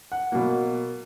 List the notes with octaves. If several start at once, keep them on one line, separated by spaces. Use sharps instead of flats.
F#5
B2 F#3 A#3